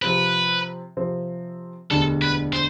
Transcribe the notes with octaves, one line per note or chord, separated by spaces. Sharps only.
C3 F3 C4 B4
C3 F3 C4
E1 D2 D3 G3 A4
B4
C5